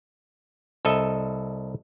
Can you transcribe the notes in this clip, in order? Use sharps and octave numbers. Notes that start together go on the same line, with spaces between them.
C2 A4 D#5 E5